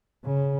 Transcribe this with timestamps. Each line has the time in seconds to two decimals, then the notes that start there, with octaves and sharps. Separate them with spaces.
0.25 C#3